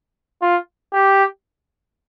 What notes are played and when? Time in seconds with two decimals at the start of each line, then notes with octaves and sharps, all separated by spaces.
0.42 F4
0.93 G4